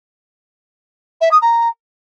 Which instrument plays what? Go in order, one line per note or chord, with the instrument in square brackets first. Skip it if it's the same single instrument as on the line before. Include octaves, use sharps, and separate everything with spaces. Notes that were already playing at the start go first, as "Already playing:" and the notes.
[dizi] E5
D#6
A#5